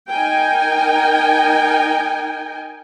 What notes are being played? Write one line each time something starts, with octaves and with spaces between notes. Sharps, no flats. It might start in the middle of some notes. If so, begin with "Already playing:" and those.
D#4 A#4 G5 G#5